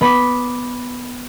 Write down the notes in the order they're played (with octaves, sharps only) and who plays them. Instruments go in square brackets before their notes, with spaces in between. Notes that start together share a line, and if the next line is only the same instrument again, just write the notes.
[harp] B3 B5 D6 B6